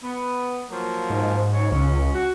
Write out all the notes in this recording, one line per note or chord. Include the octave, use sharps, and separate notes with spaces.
B3
F3 F#3 A#3
G#2
C#3 F#3 C#5
C#2 C#4
F#4